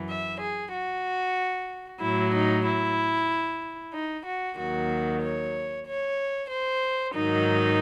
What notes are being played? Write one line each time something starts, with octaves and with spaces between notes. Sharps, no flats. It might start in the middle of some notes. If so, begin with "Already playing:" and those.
Already playing: F#2 E3
E5
G#4
F#4
A2 F#3 E4
D#4
E4
D#4
F#4
D#2 D#3 F#3 F#4
C#5
C#5
C5
G#2 D#3 F#3 D#4